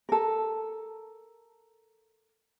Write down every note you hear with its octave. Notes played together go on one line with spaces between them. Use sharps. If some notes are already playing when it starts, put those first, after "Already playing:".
A4 A#4